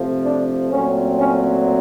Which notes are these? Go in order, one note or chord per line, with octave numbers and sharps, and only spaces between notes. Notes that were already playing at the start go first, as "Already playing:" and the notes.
Already playing: C3 F3 A3
D4
A#2 F#3 A3 C4 C#4
C#4